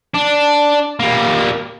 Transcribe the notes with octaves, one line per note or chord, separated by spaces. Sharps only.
D4
G3 A#3